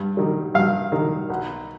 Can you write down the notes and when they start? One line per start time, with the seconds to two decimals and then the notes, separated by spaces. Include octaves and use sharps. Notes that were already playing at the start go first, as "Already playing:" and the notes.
Already playing: G2
0.17 D#3 G3
0.54 G2 F5
0.92 D#3 G3
1.30 B1